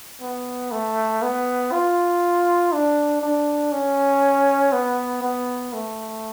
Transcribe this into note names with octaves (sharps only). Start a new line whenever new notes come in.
B3
A3
B3
F4
D4
D4
C#4
B3
B3
A3